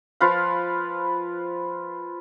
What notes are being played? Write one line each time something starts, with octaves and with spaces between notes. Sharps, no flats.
F3 F4 B4 F5